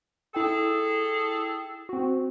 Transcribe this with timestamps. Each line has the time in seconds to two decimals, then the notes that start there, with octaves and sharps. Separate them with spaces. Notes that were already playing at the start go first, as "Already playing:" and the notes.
0.34 E4 G#4 A4 G5
1.89 C4 F#4